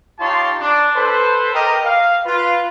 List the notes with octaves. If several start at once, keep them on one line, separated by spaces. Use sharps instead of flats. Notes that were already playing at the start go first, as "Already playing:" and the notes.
D#4 F4 G4 C#5 A5 C6
D4
A4 B4 C5
G4 A#4 D#5
F5
F4 B4